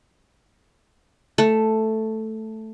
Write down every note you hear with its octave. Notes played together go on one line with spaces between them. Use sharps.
A3